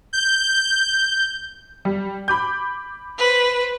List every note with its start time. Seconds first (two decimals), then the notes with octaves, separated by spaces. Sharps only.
0.13 G6
1.85 G3
2.28 B5 D6 G6
3.17 B4 C5